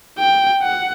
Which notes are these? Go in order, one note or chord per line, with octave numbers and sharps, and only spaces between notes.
G5
F#5